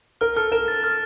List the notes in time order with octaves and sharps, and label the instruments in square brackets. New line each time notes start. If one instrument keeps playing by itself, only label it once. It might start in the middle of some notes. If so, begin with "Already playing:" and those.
[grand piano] A#4 [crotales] F6
[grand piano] A4 [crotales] F6
[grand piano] A#4 [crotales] E7
[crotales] A6
F6